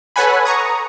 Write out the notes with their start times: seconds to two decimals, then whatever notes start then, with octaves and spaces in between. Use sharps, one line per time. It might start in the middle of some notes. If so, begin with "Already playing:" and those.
0.16 A4 B4 C#5 F#5 G#5 B5
0.45 A#5 C#6 D#6